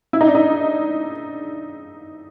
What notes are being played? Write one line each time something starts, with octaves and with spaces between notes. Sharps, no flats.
E4
D#4
D4
D#4